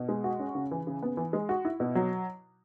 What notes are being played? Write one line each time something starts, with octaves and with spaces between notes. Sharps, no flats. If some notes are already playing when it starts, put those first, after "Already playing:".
Already playing: B2
G#3
F#4
C#4
C#3
E3
C#3
B3
E3
G#3
F#4
E4
B2
F#3